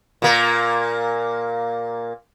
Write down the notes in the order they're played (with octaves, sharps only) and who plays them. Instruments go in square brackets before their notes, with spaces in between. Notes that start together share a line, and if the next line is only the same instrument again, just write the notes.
[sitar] A#2 A#3